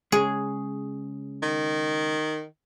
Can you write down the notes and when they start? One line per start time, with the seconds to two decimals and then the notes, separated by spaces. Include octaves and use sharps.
0.12 C#3 G#3 G#4
1.42 D#3